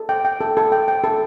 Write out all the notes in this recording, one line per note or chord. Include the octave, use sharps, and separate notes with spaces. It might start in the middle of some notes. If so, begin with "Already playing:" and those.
Already playing: A4
G5
G5
A4
A4
G5
G5
A4